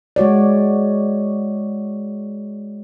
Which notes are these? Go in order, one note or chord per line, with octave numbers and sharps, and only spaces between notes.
G#3 F#4 C#5 D5